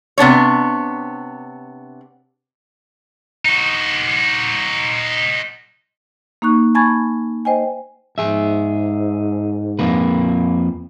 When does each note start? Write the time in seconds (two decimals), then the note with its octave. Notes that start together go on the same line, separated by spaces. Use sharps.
0.18 C3 B3 D4 C#5
3.45 D#4 F#4
6.42 A#3 D#4 C#6 F#6
6.75 G#5 A5 B5 C#6 G#6 A6
7.45 C5 D#5 G5 G#5
8.18 G#2 G#4 E5
9.79 F2 A#3 B4